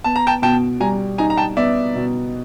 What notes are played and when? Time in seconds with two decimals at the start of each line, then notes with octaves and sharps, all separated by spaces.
0.04 B3 A5
0.16 A#5
0.27 G5 A5
0.42 B2 G5 A5
0.80 G3 G#5 A#5
1.18 D#4 G#5 A#5
1.30 A#5
1.37 G5 A5
1.57 B3 D5 E5
1.95 B2